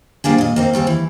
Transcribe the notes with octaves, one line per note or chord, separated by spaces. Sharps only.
F3 G3 A#3 D4 G#4
A#2 D#5
A#3 C4 D#4
D#2 G3 C4 G#4
E3